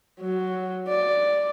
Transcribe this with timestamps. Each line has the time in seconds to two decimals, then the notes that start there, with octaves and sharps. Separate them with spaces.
0.20 F#3
0.88 D5